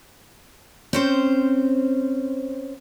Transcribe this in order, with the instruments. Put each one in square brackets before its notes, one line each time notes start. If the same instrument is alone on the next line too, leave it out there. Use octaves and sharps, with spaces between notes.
[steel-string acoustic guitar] C4 C#4 C5